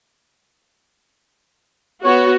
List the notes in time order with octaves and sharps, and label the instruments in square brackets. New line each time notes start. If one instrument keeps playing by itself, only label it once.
[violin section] B3 [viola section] F#4 [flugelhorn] C#5